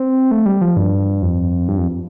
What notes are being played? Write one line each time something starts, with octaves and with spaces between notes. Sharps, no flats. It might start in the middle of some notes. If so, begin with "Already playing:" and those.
Already playing: C4
A3
G3
F3
G2
F2
G2
F2